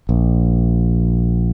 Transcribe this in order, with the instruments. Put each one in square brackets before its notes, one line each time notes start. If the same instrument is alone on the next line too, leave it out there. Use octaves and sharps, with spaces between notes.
[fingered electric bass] A#1